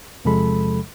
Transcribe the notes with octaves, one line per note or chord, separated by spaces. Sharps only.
E2 C3 F3 G#3 A4 B5